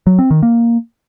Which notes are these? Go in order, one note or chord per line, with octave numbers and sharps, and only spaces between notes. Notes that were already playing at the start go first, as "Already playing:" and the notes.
F#3
C4
D#3
A#3